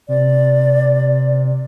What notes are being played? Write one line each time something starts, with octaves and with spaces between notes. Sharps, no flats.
C3 D5